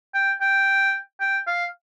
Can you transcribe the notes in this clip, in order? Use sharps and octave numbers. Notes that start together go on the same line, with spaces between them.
G5
G5
G5
F5